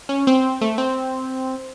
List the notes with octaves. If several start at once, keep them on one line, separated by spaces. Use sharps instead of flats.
C#4
C4
A3
C4